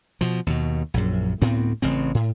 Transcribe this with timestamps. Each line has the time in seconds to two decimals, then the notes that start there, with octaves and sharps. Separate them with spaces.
0.21 B2 F3
0.47 D#2 B2
0.94 A#1 F#2
1.42 D2 A2 B3 C4
1.82 A1 C#3 C4
2.15 A2